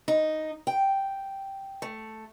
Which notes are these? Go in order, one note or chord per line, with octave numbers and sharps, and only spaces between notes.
D#4
G5
A3